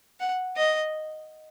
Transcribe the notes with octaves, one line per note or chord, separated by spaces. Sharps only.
F#5
D#5